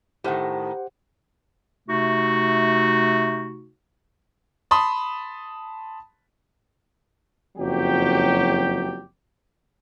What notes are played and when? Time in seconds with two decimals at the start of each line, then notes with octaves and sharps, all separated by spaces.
0.24 A2 D#3 G4 C5 F#5
1.88 C3 A3 D#4 F#4
4.71 A5 B5 C6 D#6
7.58 F#1 F2 F#3 G4